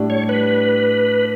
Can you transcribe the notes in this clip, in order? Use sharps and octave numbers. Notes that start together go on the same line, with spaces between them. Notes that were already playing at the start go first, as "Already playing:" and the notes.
Already playing: A2 G3 D4
C#5
B4